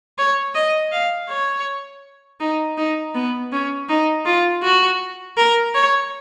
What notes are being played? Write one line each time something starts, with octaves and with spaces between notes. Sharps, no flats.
C#5
D#5
F5
C#5
D#4
D#4
B3
C#4
D#4
F4
F#4
A#4
C#5